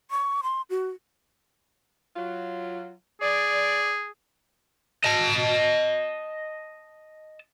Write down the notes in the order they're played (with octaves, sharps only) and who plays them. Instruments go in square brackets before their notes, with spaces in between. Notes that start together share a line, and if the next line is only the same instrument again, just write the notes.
[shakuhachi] C#6
C6
F#4
[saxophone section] F#3 F4
[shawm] G#4 [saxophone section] D5
[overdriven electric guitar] D#5 A5